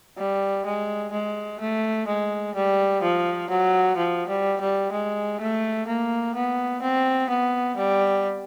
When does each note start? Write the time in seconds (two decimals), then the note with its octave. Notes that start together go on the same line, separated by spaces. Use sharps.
0.17 G3
0.65 G#3
1.12 G#3
1.60 A3
2.07 G#3
2.55 G3
3.02 F3
3.50 F#3
3.97 F3
4.28 G3
4.60 G3
4.91 G#3
5.40 A3
5.87 A#3
6.35 B3
6.82 C4
7.29 B3
7.76 G3